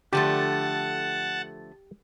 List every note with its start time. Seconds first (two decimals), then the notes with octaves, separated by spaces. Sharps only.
0.13 D3 F3 A3 G4 F#5 A5